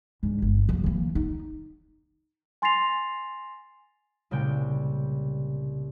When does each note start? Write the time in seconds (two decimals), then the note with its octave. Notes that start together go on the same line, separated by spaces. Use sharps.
0.23 G#2 D3
0.42 G1
0.69 F3 A#3
0.84 E3 A#3
1.15 D#4
2.62 G#5 C6 A6 A#6 C7 F7
4.31 C2 A#2 C#3 G#3 G5 D7